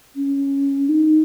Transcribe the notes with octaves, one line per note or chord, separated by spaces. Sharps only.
C#4
D#4